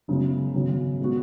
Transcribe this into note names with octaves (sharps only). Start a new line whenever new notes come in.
F#1 F#2 C#3 G#3 B3
G#1 F#2 C#3 F#3 B3
A#2 G#3 B3 F#4